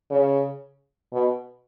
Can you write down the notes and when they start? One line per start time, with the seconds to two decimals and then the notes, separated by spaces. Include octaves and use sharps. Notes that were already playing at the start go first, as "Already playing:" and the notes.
0.11 C#3
1.13 B2